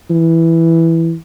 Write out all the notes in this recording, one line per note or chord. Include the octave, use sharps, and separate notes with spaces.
E3